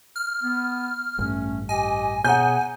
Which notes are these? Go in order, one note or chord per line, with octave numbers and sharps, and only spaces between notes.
F6
B3
A1 G2 A3 C#4
G4 D#5 G#5
B2 G#4 C#5 F#5 G#5 A#5 G6